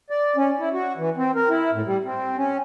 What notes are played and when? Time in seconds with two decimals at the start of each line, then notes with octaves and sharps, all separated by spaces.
0.10 D5
0.36 C#4
0.59 E4
0.73 F#4
0.97 E3
1.17 C4
1.35 A#4
1.50 E4
1.73 A2
1.85 G3
2.04 C4
2.37 C#4